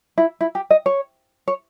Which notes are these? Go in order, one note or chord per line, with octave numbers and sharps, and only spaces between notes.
E4
E4
G4
D#5
C#5
C#5